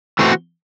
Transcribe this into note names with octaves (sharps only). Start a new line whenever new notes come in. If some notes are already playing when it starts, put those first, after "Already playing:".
E3 A3 C4 D#4 F#4